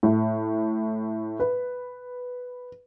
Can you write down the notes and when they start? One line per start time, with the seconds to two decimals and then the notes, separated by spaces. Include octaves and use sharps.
0.03 A2
1.40 B4